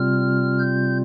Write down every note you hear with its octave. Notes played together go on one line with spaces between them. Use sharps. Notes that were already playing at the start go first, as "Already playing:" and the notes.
Already playing: C3 G3 C4 F4 F6
G6